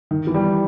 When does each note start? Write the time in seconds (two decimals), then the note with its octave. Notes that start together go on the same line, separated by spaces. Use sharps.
0.11 D#3
0.27 E3
0.34 G3